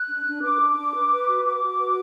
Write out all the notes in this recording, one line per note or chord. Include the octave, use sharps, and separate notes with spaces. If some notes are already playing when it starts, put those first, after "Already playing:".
Already playing: F#6
D4
D4
B4 D6
D4
D4
B4
B4
F#4
F#4 D6
F#4
B4